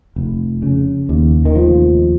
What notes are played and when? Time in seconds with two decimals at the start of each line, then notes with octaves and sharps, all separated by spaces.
0.16 F1
0.62 C#3
1.09 D#2
1.45 D#3
1.55 F1 F3